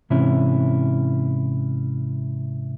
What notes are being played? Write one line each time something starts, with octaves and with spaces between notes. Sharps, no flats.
G#2 C3 E3 C#4 E4